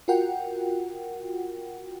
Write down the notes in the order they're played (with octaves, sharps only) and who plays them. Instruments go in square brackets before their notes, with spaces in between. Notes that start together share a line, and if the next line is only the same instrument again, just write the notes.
[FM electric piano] F4 F#4 A#4 F#5 G5